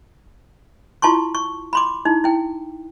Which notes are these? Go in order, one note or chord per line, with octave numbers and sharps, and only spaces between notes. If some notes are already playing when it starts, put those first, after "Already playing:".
E4 F4 A5 C6 C#6
C#6
B5 C6 D6
D#4 E4
E4 G5